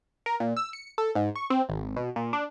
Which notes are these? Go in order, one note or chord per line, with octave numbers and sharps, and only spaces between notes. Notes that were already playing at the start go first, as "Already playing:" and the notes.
A#4
A#2
E6
C#7
A4
G#2
C#6
C4
G#1
B2
A#2
D4